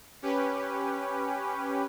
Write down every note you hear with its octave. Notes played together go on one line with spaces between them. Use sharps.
C#4 G4 B4